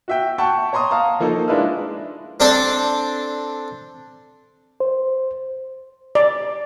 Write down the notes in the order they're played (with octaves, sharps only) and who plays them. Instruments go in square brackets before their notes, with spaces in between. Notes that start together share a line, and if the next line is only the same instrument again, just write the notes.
[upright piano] F#4 E5 G5
F#5 G5 A5 C#6
C#5 A#5 C6 C#6 D#6
F5 A5 A#5
F3 A#3 D#4 A4
G#3 D4 E4 B4 F5
[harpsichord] C4 D4 A4 D5
[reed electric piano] C5
[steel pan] D5